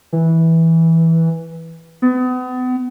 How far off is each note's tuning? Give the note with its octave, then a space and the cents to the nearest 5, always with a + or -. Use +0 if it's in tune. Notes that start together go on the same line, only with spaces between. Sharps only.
E3 -10
B3 +35